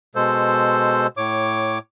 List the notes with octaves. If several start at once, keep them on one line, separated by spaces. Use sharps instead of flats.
B2 G#3 A4 C5
A2 C#5 D6